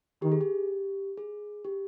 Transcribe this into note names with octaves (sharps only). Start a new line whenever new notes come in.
D#3 G4
G#4
G4
G#4
G4